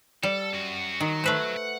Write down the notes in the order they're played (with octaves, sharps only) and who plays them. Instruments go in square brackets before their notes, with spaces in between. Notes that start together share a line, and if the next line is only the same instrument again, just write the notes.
[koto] G3 [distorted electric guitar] A4
[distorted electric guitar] F#2 F#4
[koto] D#3 [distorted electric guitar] F#3
[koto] A3 B4 C5
[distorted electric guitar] F#5